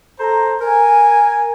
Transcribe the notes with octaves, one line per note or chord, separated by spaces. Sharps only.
A4 C5 A#5
A#4 G#5